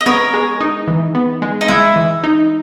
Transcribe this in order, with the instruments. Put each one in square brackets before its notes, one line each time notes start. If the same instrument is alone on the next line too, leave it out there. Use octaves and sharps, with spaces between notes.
[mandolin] D#5
[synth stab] B3 [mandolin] A#4 C#5
[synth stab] G#3
D#4
E3
B3
G#3
[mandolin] D#4
[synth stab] G#3 [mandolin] E4
[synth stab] E3
D#4